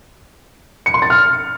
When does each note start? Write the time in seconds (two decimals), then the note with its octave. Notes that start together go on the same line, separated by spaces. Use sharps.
0.86 C#7
0.94 C6
1.02 A6
1.10 F6